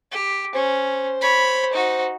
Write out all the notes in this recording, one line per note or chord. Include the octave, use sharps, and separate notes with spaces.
G4
C#4 C5
C#5 B5
D#4 F#4